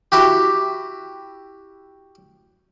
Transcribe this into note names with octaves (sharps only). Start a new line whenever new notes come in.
E4 F#4 G4